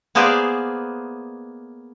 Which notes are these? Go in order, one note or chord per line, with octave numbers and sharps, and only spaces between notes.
A#3 B3 G#4 C5 D5 E5